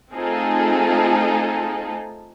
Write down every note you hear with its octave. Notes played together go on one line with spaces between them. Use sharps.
A3 C4 D#4 F4 G#4 A4